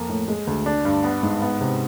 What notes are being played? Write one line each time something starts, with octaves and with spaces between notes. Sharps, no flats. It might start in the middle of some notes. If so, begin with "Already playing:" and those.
Already playing: F2 A#3
A2
G#3
D2
D4
G2
B3
G#2
B3
C3